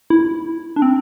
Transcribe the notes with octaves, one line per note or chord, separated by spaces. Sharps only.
E4
D4
C4